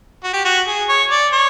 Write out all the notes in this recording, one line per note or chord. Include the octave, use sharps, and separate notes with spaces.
F#4
G4
F#4
G#4
C#5
D5
C#5